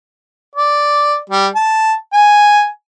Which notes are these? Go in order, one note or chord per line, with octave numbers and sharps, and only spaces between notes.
D5
G3
A5
G#5